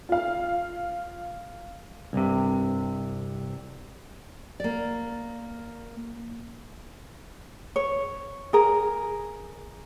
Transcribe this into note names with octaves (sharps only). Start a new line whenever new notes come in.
F4 F5
C2 G2 C3
A#3 D5
C#5
G#4 A#4